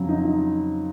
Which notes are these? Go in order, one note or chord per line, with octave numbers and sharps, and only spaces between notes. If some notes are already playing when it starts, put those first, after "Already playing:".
Already playing: F2 C#3 F#3
D#4
D#4